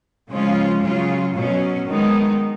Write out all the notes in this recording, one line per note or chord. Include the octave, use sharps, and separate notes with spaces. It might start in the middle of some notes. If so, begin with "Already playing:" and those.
C#3 F3 G#3 C#4 F4
C#3 F#3 C#4 F4
B2 F#3 C#4
D#3 G#3 B3 D#4